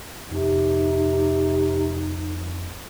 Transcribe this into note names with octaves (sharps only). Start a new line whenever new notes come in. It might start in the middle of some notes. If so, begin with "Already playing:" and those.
F2 C3 D#4